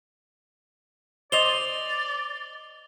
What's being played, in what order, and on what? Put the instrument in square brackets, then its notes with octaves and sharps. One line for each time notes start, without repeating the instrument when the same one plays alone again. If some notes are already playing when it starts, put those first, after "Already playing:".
[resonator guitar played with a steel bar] C5 D#5 [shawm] D5 [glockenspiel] F7 G7